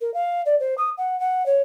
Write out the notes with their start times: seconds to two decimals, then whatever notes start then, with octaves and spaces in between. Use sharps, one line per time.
0.01 A#4
0.14 F5
0.46 D5
0.60 C5
0.78 D#6
0.98 F#5
1.20 F#5
1.46 C#5